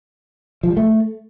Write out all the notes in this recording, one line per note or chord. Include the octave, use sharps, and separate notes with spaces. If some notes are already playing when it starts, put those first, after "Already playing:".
F3
G3
A3